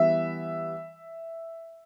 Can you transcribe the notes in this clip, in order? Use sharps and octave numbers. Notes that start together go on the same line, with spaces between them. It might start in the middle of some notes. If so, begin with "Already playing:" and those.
Already playing: E3 G3 B3 E5